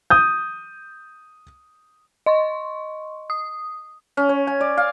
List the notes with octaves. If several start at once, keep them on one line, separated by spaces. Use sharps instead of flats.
D#6 G6
D#5 C6 C#6
D#6
C#4
C#5
G#5
D5
F5